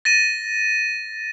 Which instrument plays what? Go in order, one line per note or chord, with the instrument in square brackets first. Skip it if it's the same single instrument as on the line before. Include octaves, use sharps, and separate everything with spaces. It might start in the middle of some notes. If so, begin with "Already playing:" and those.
[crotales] A6 A#6 D#7